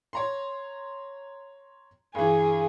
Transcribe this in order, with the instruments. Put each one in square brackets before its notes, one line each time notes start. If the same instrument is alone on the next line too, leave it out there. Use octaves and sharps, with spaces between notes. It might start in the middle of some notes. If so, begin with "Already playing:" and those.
[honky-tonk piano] C#5 A#5 C6
[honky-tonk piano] G2 E3 [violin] G#4